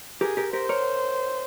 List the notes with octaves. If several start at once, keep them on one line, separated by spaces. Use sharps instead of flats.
G4 G#4 A#4
G4 A#4
G4 A#4 C5
A#4 C#5